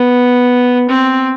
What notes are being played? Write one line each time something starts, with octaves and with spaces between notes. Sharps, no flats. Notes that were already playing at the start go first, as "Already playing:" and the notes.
Already playing: B3
C4